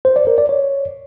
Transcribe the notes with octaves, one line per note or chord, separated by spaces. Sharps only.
C5
D5
A#4
D5
C#5